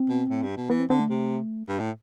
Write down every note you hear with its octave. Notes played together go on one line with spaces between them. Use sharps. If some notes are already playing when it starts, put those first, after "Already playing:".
Already playing: C4
B2
A2
G2
B2
E3 B3
C4
D3 C4
A3
C3
G2
A2